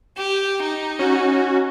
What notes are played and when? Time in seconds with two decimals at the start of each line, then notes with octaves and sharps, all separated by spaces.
0.17 G4
0.62 D#4
0.99 C#4 F#4